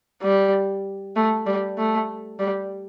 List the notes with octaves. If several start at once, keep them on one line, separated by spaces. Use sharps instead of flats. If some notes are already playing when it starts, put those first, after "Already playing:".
G3
A3
G3
A3
G3